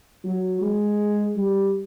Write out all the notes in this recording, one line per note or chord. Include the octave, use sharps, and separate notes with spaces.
F#3
G#3
G3